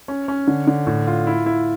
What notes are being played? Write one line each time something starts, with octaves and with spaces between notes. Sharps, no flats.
C#4
C#4
D3
D3
A2
F4
E4
E4